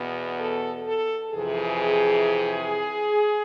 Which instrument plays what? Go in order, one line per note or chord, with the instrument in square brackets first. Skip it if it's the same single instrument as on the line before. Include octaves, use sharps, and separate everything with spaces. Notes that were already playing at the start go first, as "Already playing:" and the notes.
Already playing: [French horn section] E2 B2 B3
A4
A4
F2 C3 E3 G#4